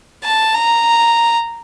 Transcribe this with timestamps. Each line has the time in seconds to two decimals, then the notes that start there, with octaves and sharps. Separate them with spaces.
0.24 A5
0.55 A#5